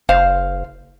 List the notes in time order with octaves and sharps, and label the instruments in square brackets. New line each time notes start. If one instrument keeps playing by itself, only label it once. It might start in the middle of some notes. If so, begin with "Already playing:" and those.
[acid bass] F#1 [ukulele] C5 F5